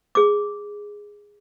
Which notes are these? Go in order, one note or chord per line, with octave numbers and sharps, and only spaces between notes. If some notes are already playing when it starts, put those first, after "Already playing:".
G#4 D6